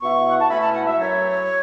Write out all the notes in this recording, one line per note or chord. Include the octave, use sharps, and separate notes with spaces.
B2 B3 E4 C#6
F#5
A5
B2 A3 C#4 E4 B5
A5
F#5
E5
F#2 F#3 A3 C#4 E4 C#5